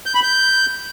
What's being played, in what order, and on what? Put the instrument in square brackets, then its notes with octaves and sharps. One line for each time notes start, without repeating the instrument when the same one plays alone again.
[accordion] G6
B5
G6